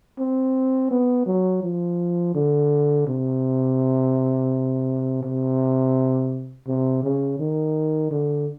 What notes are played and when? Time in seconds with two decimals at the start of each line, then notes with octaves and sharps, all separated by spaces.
0.18 C4
0.91 B3
1.26 F#3
1.63 F3
2.35 D3
3.07 C3
5.23 C3
6.67 C3
7.03 C#3
7.39 D#3
8.11 D3